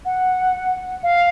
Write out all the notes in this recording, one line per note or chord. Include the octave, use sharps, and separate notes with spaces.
F#5
F5